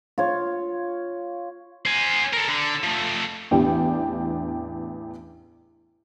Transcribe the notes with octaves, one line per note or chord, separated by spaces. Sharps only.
F4 C#5
C5 G#5
A4 A#4
D3
F3 A3
A1 E2 D4 G4 G5